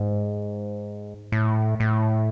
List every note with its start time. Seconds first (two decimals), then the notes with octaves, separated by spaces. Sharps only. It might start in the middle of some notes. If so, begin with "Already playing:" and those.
Already playing: G#2
1.32 A2
1.80 A2